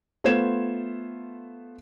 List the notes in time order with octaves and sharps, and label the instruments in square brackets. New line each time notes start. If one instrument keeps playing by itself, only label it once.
[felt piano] A3 B3 F4 C5 G#6 E7